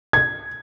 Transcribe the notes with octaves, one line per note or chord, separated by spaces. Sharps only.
G#6